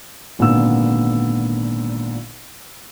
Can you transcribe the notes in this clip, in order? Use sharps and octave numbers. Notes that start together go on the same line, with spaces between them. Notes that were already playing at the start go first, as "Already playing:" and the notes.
G#1 A#2 D3 B3 E6